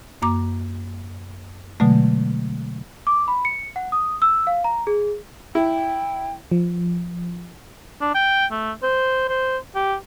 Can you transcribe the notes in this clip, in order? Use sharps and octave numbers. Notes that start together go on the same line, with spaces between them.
F#2 A#3 A#5 D6
B2 D3 F#3 G#3 A3
D6
B5
C#7
F#5
D#6
E6
F5
A#5
G#4
E4 G5
F3
D4
G5
A3
C5
C5
G4